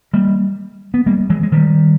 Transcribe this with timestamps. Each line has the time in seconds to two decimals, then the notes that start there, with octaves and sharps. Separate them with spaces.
0.13 G3 A#3
0.94 B3
1.06 G3 A#3
1.30 E3 G#3
1.43 G#3
1.52 D#3 G3